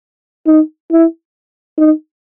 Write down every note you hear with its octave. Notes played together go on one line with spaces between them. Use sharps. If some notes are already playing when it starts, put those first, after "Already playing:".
D#4
E4
D#4